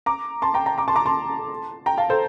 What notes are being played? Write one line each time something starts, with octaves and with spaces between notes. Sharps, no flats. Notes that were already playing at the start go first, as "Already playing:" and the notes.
A#5 D6
A5 C6
G5 A#5
G5 A#5
A#5 D6
A5 C6
A#5 D6
A5 C6
G5 A#5
F5 A5
A4 C5